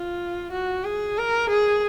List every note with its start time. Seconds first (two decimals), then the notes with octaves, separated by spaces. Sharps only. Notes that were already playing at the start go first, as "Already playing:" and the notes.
Already playing: F4
0.52 F#4
0.84 G#4
1.18 A#4
1.49 G#4